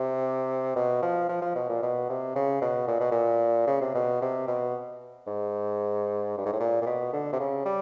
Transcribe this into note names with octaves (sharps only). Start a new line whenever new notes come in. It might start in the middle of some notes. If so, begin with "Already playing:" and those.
Already playing: C3
B2
F3
F3
F3
B2
A#2
B2
C3
C#3
B2
A#2
B2
A#2
C#3
C3
B2
C3
B2
G#2
G2
G#2
A2
A#2
A#2
B2
D3
C3
C#3
G3